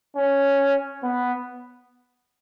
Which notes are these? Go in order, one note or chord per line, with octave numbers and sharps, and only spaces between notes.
C#4
B3